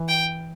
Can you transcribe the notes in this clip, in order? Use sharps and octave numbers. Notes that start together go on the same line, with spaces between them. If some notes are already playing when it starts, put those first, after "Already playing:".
Already playing: E3
G5